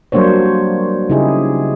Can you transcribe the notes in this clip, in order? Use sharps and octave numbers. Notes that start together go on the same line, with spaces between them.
F#3 G3 A#3 D4 C5 C#5
C#3 D#4 E4 G4 G#4